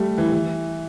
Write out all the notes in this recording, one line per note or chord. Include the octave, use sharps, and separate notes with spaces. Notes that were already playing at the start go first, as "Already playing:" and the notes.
Already playing: G3 A3
E3
E3